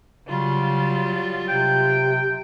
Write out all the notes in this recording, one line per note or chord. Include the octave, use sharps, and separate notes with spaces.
C#3 F#3 G3 F4
C3 G5